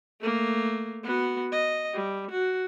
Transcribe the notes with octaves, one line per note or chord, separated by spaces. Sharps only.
A3 A#3
B3 F#4
D#5
G3
F#4